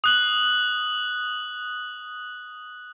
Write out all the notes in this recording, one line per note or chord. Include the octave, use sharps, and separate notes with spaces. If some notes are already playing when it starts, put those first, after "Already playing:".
D#6 F#6 F#7